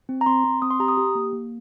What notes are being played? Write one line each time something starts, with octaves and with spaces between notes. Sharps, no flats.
C4
A#5
C4 C6
C4
C4 D#6
C6
G4 A#5
D#6
G4
A#3
A#3